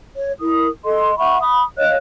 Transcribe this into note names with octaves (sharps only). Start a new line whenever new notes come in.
C#5
E4 A#4 D#6
A4 D#5 C6
E5 F#5 B5 C#6
B5 D#6
C#5 D#5 F5 F#6